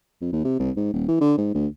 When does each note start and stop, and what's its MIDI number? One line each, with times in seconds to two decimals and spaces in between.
0.21 0.32 41
0.32 0.43 39
0.44 0.58 48
0.59 0.71 36
0.76 0.90 44
0.93 1.06 27
1.08 1.21 52
1.21 1.34 50
1.37 1.52 44
1.54 1.67 38